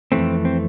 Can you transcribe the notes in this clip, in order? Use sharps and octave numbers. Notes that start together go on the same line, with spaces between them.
F2 E3 A3 C4
C4